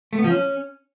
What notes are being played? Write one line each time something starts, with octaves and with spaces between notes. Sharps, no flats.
A3
B3
F3
C#4